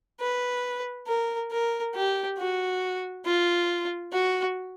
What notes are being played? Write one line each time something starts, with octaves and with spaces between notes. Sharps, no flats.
B4
A#4
A#4
G4
F#4
F4
F#4